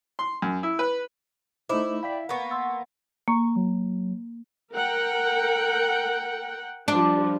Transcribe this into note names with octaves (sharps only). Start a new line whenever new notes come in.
C6
F#2
E4
B4
A3 D#4 E4 C5 D#5 E5 D6
D5 F5 G5 B5 B6
A#3 B3 F#5 C#6
C6 E6 A6
A#3 C#6
F#3
A#4 F#5 G5
F3 G3 D4